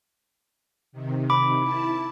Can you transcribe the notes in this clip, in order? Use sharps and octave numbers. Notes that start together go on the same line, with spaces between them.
C3 D#3
B5 D6
E4 A5